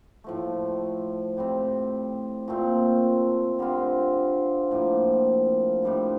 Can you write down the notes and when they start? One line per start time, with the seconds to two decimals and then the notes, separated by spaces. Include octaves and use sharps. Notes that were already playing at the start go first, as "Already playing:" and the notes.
0.24 A2 F3 A3
1.37 A2 G3 C4
2.48 A#2 A3 C4 F4
3.59 D3 G3 C4 F4
4.71 A2 F3 A#3
5.83 A2 G3 D4 F4